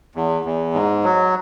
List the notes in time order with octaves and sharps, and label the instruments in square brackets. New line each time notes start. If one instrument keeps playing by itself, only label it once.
[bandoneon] E2
E2
G#2
F#3